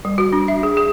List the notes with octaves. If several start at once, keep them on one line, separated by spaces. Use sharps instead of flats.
G3
F#4
D4
E5
G#4
G#4